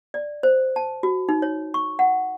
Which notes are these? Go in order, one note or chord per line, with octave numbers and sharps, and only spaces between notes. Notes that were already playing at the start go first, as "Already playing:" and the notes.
D5
C5
A5
F#4
D#4
C#5
C#6
F#5